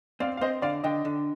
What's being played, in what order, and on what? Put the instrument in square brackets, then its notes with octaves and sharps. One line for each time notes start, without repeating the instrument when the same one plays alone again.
[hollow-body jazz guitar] C4 [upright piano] D5 F5
[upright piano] F5
[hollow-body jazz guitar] C4 [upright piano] C5 D#5
[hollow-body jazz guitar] D3 [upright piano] D5 F5
[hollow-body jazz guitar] D3 [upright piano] D#5 G5
[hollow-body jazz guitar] D3